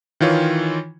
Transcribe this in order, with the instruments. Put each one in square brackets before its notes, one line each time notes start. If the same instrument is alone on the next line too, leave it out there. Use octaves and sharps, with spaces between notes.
[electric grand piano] D#3 E3 F4 C#5